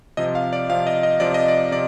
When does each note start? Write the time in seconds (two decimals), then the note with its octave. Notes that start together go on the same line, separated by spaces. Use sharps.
0.17 C3 F3 D#5
0.35 F5
0.53 D5
0.69 C3 F3 F5
0.87 D#5
1.03 D#5
1.20 C3 F3 D5
1.34 D#5
1.48 D5
1.72 C3 D5